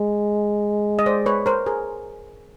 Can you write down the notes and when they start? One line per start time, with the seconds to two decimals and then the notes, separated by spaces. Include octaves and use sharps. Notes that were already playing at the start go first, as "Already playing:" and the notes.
Already playing: G#3
0.99 D#5
1.06 C5 D5
1.26 B4 C#5
1.46 A#4 C5
1.66 G#4 A#4